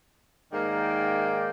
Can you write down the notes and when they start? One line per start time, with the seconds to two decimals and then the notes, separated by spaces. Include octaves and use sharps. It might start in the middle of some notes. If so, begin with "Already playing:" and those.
0.52 G#2 D#3 A#3 A#4 D5 G5